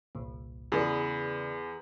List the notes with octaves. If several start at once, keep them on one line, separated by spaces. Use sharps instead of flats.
G1 C2 A#2
E2 C#3 G#4 B4 D5